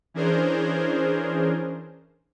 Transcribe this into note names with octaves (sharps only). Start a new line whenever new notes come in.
E3 C#4 D4 G#4 A#4 C5